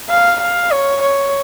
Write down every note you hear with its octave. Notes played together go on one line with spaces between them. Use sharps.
F5
F5
C#5
C#5